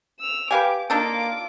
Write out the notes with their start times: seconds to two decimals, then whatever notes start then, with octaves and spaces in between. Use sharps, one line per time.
0.20 E6 F7
0.51 G4 B4 F5 G#5 D6
0.90 A#3 D4 D#4 F4 A4 D6